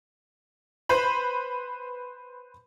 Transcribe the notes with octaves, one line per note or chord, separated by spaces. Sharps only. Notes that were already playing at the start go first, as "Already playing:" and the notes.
B4 C5 B5